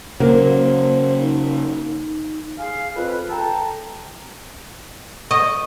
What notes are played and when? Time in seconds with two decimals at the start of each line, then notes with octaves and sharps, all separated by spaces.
0.20 C#3 F#3 A#3 C5
1.19 D#4
2.58 G#4 F5
2.96 F2 B4
3.30 A4 G5 A5 A#5
5.31 D#5 C#6